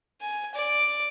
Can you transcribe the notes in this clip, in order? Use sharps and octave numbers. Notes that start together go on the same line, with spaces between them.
G#5
D5